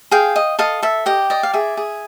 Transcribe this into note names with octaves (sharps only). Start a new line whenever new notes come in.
G#4 F5 G5
D#5
A4 D#5 F5
A4 E5
G4 D#5
D5 D#5
F5
G#4 E5
G#4